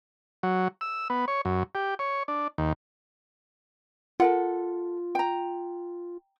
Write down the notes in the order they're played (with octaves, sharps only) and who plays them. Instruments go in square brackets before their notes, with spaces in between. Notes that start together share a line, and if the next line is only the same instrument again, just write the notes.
[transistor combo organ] F#3
E6
B3
C#5
F#2
G4
C#5
D4
D#2
[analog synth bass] F4 [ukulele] A4 A#4 F#5
[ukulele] G5 A#5